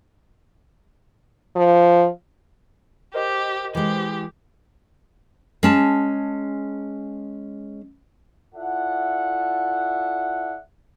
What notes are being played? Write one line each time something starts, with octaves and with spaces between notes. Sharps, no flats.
F3
G4 A#4 C5 D#5
E3 G#3 G4
G#3 C#4 A5
E4 F4 A4 D5 E5 F#5